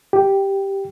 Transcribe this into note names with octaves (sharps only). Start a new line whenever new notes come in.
G4